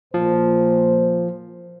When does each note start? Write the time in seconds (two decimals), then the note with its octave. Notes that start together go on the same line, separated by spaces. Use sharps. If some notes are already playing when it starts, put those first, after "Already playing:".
0.14 A#2 F3 C5